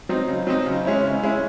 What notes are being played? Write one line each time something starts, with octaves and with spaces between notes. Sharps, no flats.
F#3 C4 D#4
C#3
F#3 C4 D#4
C#3
G#3 C#4 E4
C#3
G#3 C#4 E4